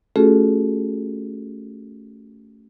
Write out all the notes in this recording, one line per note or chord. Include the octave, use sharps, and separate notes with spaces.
A3 C#4 F4 F#4 G#4 A4